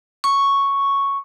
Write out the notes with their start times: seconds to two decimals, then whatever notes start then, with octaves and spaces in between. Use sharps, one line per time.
0.24 C#6